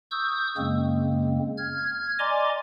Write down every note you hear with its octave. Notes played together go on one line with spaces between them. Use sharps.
C#6 D#6 E6 G6
F#2 C#3 G#3 A#3 C4
F6 G#6
D5 D#5 G#5 A#5 C6 D6